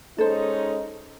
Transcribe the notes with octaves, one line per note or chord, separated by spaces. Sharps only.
G#3 C#4 D#4 A4 C5